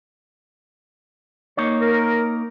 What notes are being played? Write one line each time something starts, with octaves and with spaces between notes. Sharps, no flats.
A#3 D#4 C#5
A#4